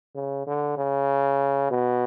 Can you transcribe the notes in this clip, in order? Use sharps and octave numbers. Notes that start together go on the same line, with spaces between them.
C#3
D3
C#3
B2